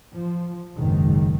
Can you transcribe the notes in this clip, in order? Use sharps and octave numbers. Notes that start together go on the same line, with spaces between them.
F3
F#1 C#2 G#2 B2 D#3